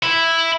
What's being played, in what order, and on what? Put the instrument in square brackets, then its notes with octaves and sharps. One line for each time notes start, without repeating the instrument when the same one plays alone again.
[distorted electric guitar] E4